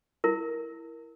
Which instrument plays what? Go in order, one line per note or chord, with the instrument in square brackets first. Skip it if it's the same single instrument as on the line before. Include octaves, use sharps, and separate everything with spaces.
[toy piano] E4 A#4